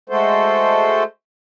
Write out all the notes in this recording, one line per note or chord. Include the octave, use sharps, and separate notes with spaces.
G#3 A3 F#4 A4 C5